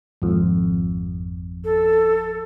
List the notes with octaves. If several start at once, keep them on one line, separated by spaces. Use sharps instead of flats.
G#1 F2
A4